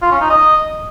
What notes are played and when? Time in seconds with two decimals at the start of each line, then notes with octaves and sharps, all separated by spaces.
0.02 F4
0.11 C#4
0.21 D#4
0.30 D#5